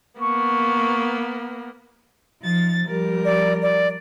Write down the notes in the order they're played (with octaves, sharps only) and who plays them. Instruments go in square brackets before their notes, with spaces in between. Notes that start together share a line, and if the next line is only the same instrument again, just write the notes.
[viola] A#3 B3 [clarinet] C#6
[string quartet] F3 D#4 A6
F3 G3 A#4
[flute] D5
D5